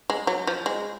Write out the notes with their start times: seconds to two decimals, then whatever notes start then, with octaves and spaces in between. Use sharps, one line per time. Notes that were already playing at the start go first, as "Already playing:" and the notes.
0.10 G#3
0.27 F#3
0.47 F3
0.66 G#3